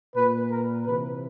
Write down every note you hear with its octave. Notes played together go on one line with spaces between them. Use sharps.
A#2 B4
A#4
C3 E3 B4